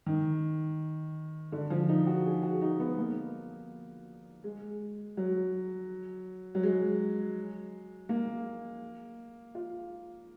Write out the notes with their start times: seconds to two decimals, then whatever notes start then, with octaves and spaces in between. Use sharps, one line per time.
0.06 D#3
1.52 D3
1.70 F3
1.89 D#4
2.07 F#4
2.25 G#4
2.43 F#4
2.62 D#4
2.80 B3
2.98 A#3
4.44 G#3
5.17 F#3
6.55 F#3
6.63 G#3
8.09 A#3
9.55 F4